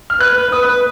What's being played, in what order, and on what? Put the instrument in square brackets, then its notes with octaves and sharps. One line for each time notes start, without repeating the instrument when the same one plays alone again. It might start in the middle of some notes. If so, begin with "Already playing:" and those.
[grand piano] F6
[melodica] B4 [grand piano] F#6
[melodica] B4
[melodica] B4 [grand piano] D#6
[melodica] B4